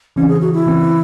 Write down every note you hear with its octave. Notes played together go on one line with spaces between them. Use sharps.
C#3 E3 C4 C#4
G#4
F#4
E4
C#3 E3 C4